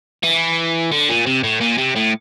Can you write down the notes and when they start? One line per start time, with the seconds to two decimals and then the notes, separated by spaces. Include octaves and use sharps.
0.23 E3
0.92 D3
1.09 A#2
1.26 C3
1.44 A2
1.61 A#2
1.78 C3
1.96 A2